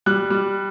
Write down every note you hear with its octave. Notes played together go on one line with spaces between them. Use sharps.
G3 F#6
G3